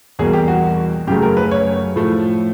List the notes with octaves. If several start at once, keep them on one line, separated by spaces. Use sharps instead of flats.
E2 B2 G3 A#3 G#4
G4
F#4
F#2 C#3 F#3 A3 G4
A#4
B4
C#5
A2 F3 A3